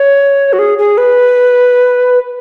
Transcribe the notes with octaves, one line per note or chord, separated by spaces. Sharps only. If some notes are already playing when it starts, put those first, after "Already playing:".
Already playing: C#5
F#4
G#4
G#4
B4